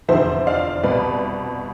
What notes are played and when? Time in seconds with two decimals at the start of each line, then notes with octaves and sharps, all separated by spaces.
0.08 F1 E2 D3 F3 C5 E5
0.47 D5 F5
0.83 C2 B2 B4 D5